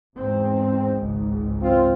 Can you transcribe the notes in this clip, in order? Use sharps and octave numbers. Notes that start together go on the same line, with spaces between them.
E2 G#2 C4
G#1 C#2 G#2
F#2 C4 F4